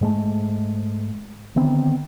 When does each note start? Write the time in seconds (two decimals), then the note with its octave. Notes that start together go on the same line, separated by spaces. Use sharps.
0.01 G#2 G#3 A3
1.56 D3 D#3 B3 C4